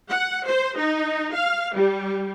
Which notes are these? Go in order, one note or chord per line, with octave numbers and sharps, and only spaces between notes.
F#5
C5
D#4
F5
G3